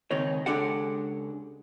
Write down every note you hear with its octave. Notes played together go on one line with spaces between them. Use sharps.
C#2 C3 D#3 D#4 C#5
C#2 G#3 D4 G4 A4 F#5